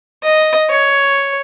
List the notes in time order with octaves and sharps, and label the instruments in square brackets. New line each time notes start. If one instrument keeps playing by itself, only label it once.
[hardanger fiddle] D#5
C#5